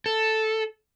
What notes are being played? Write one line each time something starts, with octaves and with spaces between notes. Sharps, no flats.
A4